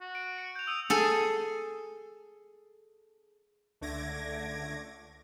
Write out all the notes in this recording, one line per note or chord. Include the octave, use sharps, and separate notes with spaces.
F#4
D7
C#7
G6 F7
D#6 E6 F7
G#4 A4 G#5
C#2 D3 A3 D6 G#6 A#6